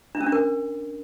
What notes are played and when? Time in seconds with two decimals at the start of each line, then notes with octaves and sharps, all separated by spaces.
0.15 D4
0.21 C#4
0.26 D4
0.32 A#4